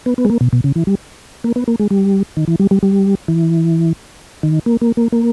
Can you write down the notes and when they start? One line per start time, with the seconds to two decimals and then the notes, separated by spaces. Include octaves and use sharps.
0.06 B3
0.18 B3
0.25 G#3
0.30 A#3
0.41 B2
0.53 B2
0.64 C#3
0.76 E3
0.87 G3
1.44 A#3
1.56 B3
1.68 A#3
1.80 G#3
1.91 G3
2.37 D#3
2.48 E3
2.60 G3
2.71 G3
2.83 G3
3.28 E3
4.43 D#3
4.66 A#3
4.81 A#3
4.97 A#3
5.12 A#3